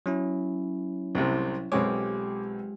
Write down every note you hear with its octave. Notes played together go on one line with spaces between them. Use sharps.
F#3 C#4 E4
C2 A2 C3
B1 G#3 C4 F4 G4 C#5 D6